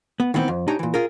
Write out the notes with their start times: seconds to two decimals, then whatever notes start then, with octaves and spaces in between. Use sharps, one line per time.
0.20 B3
0.34 D#3 E3 B3 C4
0.48 F2
0.68 D4 D#4 G4 C#5 G#5 A#5
0.79 A#2 E3
0.94 F4 G#4 A#4